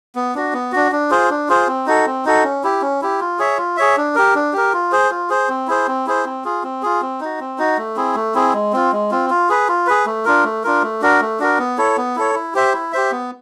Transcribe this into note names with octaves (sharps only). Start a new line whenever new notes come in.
B3
D4 F#4
B3
D4 F#4
D4
F4 G#4 C5
D4
F4 G#4 C5
C4
D#4 F#4 A4
C4
D#4 F#4 A4
C#4
E4 G4
C#4
E4 G4
F4
G#4 C#5 E5
F4
G#4 C#5 E5
D4
G4 A#4
D4
G4 A#4
F4
G#4 C5
F4
G#4 C5
C4
E4 G#4 C5
C4
E4 G#4 C5
C4
F4 G#4
C4
F4 G#4
C4
D#4 F#4
C4
D#4 F#4
A3
C4 E4 G#4
A3
C4 E4 G#4
G#3
C4 F4
G#3
C4 F4
F4
G#4 B4
F4
G#4 B4
A3
D4 F4 A#4
A3
D4 F4 A#4
A3
D4 F#4 A#4
A3
D4 F#4 A#4
B3
E4 A4 C#5
B3
E4 A4 C#5
E4
G4 C5 E5
E4
G4 C5 E5
B3